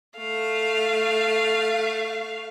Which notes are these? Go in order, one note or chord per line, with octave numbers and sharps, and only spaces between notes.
A3 F5